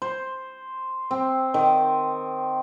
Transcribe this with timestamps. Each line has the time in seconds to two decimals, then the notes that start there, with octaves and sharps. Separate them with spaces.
0.02 C5
1.11 C4
1.54 D#3